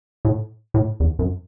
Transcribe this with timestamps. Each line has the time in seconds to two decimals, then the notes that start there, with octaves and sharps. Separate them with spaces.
0.25 A2
0.74 A2
1.00 E2
1.19 F#2